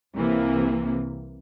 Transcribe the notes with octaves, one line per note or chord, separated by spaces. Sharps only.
C2 C3 E3 A#3